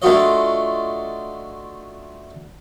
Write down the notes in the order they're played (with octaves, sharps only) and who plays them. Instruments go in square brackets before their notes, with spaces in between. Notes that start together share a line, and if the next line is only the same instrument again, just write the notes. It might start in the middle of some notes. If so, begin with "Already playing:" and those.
[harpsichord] A3 D4 F4 F#4 D#5